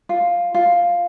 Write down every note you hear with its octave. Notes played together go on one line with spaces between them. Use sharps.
F4
F4